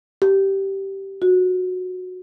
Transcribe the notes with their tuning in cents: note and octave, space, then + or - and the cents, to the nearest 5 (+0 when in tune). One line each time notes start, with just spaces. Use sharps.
G4 -10
F#4 -15